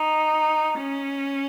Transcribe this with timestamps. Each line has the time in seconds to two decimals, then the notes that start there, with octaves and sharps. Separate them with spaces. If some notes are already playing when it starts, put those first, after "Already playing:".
Already playing: D#4
0.79 C#4